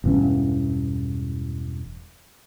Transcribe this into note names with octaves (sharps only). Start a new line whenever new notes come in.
E1 G2 E3 C#4